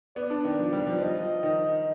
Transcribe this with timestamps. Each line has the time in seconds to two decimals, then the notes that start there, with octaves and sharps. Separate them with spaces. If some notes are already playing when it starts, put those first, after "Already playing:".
0.16 B3 D5
0.30 D4
0.45 D#3
0.59 F3
0.73 G3
0.87 F3
1.01 F3 D#5
1.43 D#3